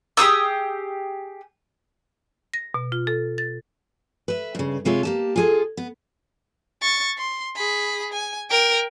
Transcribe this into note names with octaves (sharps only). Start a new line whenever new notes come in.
G4 G#4 D#6 E6
A#6
B2
F4
A4
A6
B4 E5
G2 C#3
C3 G#3 F4 B4 C#5 E5
A#3 G4 A5
F4 G#4 A4
B3
C#6 A6
C6
G#4 B5
G#5
A#4 G5